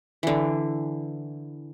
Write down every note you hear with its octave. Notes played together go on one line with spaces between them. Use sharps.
D3 E3